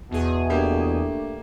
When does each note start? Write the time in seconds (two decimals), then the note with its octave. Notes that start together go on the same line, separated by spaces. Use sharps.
0.11 E2 B2 G#4
0.50 A3 A#3 D4 G4